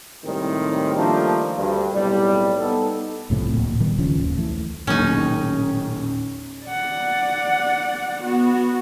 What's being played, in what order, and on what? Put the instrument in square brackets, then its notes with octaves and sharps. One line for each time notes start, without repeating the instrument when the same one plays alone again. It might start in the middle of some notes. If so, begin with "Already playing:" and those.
[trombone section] C2 A2 D#3 G3 G#3 C4
D#3 F3 G3 A3 A#3 D4
D2 G2
B1 A2 C3 G3
B3 D#4 A4
[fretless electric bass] C2 A2 C3 F3
D1 A#2
D#3 G3 B3
D1 C#2 F3 C#4
D#2
D2 E3 A3
[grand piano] E1 A1 D#2 [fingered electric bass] A#2 F#3 A#3 [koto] C#4 D#4
[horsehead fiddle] D5 F#5
B3 F#4